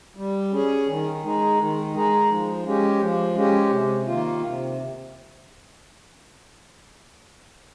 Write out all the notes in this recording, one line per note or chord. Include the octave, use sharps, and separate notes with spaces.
G3
C#4 G#4
D#3
G#3 D#4 G#4
D#3
G#3 D#4 G#4
F3
G#3 C#4 G4
F3
G#3 C#4 G4
C3
D#3 A#3 F4
C3